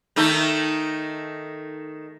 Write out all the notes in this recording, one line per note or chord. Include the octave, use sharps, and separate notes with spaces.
D#3 A3 D#4